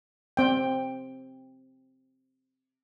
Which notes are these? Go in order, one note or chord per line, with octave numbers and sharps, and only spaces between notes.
C4 G5